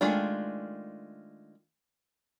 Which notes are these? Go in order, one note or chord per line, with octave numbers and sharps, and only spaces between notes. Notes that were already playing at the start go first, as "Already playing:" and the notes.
D#3 G#3 A3 D4 F4